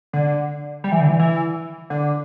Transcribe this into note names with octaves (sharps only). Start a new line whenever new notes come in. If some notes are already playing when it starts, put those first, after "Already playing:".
D3
G3
E3
D3
E3
E3
D3